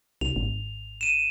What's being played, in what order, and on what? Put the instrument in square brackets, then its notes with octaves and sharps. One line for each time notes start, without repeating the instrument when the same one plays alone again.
[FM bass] C2 [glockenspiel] F7
[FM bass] G#1
[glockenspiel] D#7 E7